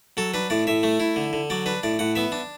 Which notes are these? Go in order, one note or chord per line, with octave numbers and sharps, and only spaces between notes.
F#3 A4
D4 B4
A2 D5
A2 E5
A3
E4
D3
D3
F#3 D5
D4 B4
A2 D5
A2 F#5
B3 E5
D4